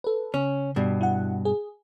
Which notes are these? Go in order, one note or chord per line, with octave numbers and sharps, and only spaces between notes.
A4 B4
C#3 C#4
G2 B2
E4 F#5
G#4